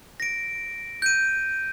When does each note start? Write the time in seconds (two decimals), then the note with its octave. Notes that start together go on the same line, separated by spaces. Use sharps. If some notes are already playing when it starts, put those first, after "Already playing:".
0.20 A#6 D7
1.02 G6 D#7